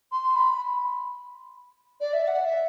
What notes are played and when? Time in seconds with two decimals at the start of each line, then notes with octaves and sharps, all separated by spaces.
0.12 C6
0.35 B5
2.00 D5
2.13 E5
2.27 F#5
2.45 E5